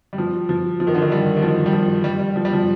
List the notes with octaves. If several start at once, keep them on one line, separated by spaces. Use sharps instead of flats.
G3
F3
F3
F3
D#3
D3
D#3
G3
D#3
F3
G3
F3
G3
G3
F3
G3
F3